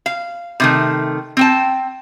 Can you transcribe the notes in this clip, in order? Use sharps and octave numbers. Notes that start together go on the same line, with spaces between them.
F5
C3 D#3 A3
C4 G5 A5